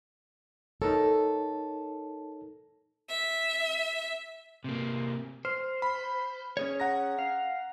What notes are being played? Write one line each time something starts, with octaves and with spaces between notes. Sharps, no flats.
D#4 A4 A#4 C#5
E5
C3 A#3
C5 F6
B5
C#4 G#4 C#5
F#5 A#5 A#6
F5